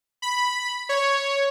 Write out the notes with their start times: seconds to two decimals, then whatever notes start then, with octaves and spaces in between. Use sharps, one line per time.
0.22 B5
0.89 C#5